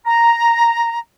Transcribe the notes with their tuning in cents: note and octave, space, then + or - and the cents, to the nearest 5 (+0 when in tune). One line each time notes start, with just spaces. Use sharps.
A#5 +0